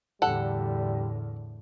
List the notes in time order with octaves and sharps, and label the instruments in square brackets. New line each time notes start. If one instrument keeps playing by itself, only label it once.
[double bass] E2 D3 [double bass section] A2 [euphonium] G3 [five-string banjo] A4 F#5